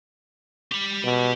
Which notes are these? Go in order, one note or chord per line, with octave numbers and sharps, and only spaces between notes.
G4 B5
B2